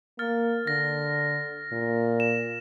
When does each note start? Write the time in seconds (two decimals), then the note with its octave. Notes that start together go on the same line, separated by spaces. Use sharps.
0.19 A#3 F6 A6
0.67 D3 A#6
1.72 A#2
2.20 E7